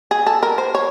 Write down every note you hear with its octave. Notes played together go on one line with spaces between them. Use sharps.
G#4
A4
A#4
C5
C#5